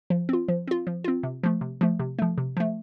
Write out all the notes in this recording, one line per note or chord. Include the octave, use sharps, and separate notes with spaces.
F3
C4 F4
F3
C4 F4
F3
C4 F4
C3
F3 A3
C3
F3 A3
C3
F3 A3
C3
F3 A3